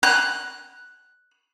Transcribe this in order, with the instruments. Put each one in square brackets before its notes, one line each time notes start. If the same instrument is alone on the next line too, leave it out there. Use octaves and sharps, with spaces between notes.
[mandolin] F#6